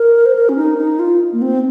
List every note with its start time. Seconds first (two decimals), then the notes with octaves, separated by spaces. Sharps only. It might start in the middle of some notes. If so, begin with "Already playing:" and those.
Already playing: A#4
0.26 C5
0.35 A#4
0.49 C#4
0.56 D#4
0.78 D#4
0.99 F4
1.33 A#3
1.42 C4